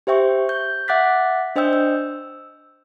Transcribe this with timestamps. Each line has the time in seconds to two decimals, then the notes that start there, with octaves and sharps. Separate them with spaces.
0.07 G4 C5 E5 G5 C#6
0.49 G6
0.88 E5 F#5 D6 F#6 A6 B6
1.56 D4 C5 D#5 G5 E6 G6
1.73 E6